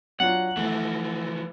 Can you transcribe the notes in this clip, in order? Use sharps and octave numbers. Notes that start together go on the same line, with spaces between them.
F#3 D4 F4 F#5
E3 F3 A3